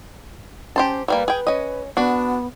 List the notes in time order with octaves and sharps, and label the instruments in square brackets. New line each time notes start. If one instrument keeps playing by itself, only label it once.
[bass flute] C#4 [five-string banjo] G4 C5 A5
[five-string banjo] F#3 G3 A#3 [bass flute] B4
[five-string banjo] G#4 G5
C#4 D#5
[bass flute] B3 [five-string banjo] D4 F#4